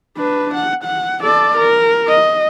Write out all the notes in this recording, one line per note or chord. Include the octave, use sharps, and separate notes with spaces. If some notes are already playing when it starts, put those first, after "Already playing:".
D4 B4
F#5
F#5
A4 D5
A#4
D#5